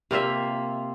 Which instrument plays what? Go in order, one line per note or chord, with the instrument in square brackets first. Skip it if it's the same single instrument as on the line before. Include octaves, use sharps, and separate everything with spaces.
[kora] C3 A#3 F4 E5